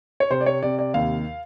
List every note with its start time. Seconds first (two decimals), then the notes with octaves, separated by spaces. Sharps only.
0.20 C#5
0.30 C3 C5
0.41 D5
0.46 C#5
0.63 C3 D5
0.79 D5
0.94 D#2 F5